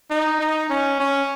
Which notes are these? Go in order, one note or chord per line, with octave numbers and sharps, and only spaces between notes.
D#4
D#4
C#4
C#4